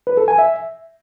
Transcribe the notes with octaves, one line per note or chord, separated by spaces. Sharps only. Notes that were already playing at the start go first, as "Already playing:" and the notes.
B4
A4
G#5
E5